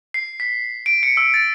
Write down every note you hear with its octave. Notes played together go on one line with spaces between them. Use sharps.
C7
B6
D7
C#7
E6
A6